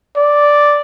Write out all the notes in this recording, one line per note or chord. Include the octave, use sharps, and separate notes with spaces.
D5